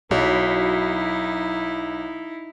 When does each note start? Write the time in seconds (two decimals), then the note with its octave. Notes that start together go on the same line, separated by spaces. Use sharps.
0.11 B1 F#3 D#4 E4